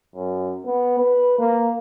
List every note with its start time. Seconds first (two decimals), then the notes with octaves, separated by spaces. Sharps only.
0.15 F#2
0.65 B3
0.99 B4
1.39 A#3